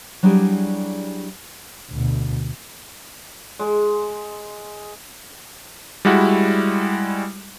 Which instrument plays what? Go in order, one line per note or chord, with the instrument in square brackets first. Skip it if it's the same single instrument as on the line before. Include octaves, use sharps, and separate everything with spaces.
[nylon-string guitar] F#3 G3 D4 E4 G#4
[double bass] D2 B2
[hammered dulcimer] G#3
[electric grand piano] G3 G#3 E4 F#4